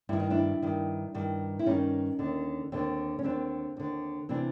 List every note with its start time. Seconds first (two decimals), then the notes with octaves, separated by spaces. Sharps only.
0.09 G2 D#3 E4
0.20 D#4
0.30 D4 E4
0.62 G2 D#3
1.15 G2 D#3
1.59 E4
1.66 G2 D#3 C#4 D#4
2.19 D#2 D3
2.72 D#2 D3 C4 D4
3.19 C#4
3.24 D#2 D3 C4 D4
3.77 D#2 D3
4.29 C3 E3 C4 D4